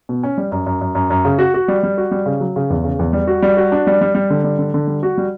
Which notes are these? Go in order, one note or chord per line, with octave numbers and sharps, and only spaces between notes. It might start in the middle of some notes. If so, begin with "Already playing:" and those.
B2
C#4
G3
F#2
F#2
F#2
F#2
F#2
C#3
F#4
F#4
G3
G3
F#4
G3
C#3
F#3
C#3
E2
C#3
E2
G3
F#4
G3
F#4
D4
G3
G3
G3
D3
G3
D3
D3
G3
F#4
G3